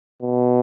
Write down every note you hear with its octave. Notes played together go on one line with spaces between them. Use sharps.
B2